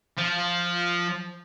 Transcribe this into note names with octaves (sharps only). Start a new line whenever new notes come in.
F3